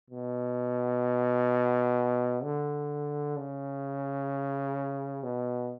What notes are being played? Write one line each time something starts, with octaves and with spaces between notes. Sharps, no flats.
B2
D3
C#3
B2